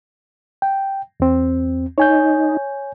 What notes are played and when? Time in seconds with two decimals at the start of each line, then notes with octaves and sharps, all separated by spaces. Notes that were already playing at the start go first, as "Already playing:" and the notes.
0.62 G5
1.20 E2 C4
1.98 D#4 C#5 G#5 G6